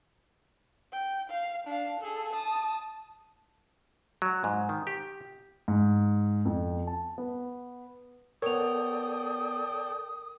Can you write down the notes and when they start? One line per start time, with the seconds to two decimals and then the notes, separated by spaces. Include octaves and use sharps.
0.93 G5
1.29 F5
1.67 D4 F5
2.00 G#4 A4
2.33 A5 D#6
4.22 F#3
4.44 G#2
4.69 D#3
4.87 G4
5.68 G#2
6.45 F2
6.87 A5
7.18 B3
8.42 B3 A4 A#4 C#5 D5 G5 D#6 F7